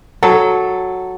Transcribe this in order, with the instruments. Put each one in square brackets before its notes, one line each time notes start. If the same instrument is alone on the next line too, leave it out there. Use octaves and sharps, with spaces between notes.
[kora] F#3 [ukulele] A4